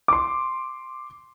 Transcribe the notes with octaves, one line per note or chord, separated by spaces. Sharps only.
C6 D6